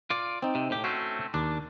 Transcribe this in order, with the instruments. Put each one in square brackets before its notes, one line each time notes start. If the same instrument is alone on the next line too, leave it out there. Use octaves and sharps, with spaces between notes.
[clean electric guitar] F4 D5
[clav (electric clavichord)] C4 D#4
[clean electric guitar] C3
A2 G4
[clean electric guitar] A3 C4 C#4 [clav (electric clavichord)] F#4
[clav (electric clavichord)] D#2 [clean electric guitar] D4